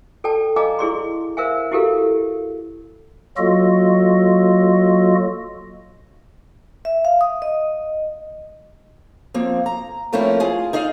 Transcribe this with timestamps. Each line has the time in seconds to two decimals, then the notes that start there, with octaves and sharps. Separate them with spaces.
0.24 A4 D5 G5 A5
0.56 D5 D#5 F5 G#5 A#5 D6
0.79 E4 G#4 D5 C6
1.37 A#4 C5 E5 F5 G#5
1.72 E4 F#4 G4 A4 A#4 F5
3.37 F#3 A#3 F4 F#4 A4 D#5
6.85 E5
7.05 F5
7.21 D#6
7.42 D#5
9.34 F3 A#3 C4
9.66 A#5
10.13 F3 A3 A#3 C4 C#4 E4
10.40 F4 G#4
10.73 D#4 D5 D#5 F5